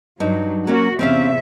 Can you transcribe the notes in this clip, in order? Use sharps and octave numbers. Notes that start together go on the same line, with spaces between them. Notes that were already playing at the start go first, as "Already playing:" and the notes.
G2 F#3 D#4
F#3 A#3 C#4 F#4
E2 C3 C4 C#4 E5 F5